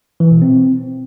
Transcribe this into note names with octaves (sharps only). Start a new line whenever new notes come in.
E3
B2
C4